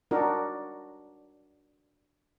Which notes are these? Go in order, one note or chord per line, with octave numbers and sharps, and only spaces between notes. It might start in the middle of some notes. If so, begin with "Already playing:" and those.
D4 D#4 F#4 A#4